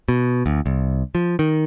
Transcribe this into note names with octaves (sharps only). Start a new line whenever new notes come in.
B2
D2
C2
F3
D#3